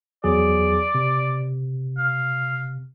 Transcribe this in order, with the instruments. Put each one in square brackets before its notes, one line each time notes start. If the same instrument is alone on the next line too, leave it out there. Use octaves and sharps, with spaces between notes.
[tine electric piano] E2 F#3 G#4 [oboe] D5
[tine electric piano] C3
[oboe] F5